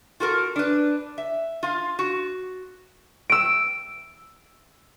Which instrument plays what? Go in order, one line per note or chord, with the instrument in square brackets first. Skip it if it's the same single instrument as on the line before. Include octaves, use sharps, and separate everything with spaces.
[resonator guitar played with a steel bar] F4 F#4 A4 A#4
D4 B4
E5
F4 F5
F#4
[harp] E6 D7